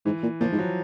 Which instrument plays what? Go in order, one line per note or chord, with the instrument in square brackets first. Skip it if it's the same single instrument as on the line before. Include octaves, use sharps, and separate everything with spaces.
[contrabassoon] G#2 [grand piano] E3
[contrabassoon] A#2
[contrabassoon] A#2 [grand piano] F3
[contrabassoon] G#2
[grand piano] F#3